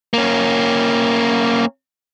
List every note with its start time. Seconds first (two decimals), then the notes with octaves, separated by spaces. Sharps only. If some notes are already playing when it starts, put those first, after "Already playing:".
0.14 A#3 C#4